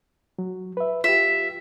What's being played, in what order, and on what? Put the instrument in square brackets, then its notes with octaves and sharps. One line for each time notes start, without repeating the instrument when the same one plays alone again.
[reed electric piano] F#3
B4 E5
[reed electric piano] F4 G4 [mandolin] E5